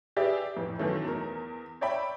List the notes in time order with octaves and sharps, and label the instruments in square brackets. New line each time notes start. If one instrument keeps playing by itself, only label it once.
[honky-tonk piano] G4 G#4 B4 D5 E5
F2 A2 E3
F#2 B2 D#3 E3 A3 C#4
E2 A#4
C#5 D5 E5 G5 B5